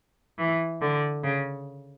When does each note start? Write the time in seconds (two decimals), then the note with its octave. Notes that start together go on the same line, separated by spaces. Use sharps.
0.38 E3
0.81 D3
1.23 C#3